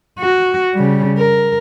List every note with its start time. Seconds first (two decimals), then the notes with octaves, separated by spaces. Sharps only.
0.19 F#4
0.74 C#3 G3
1.18 A#4